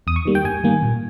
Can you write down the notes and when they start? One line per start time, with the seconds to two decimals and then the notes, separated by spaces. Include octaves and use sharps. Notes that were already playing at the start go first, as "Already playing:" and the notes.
0.07 E2 D#6
0.16 C#6
0.25 D#3 G3 A#3
0.35 G5
0.45 G2 G#5
0.64 D#3 G3 A#3
0.82 A#2